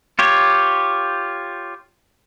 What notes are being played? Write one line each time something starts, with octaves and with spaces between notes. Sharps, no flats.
F4 G4 C#5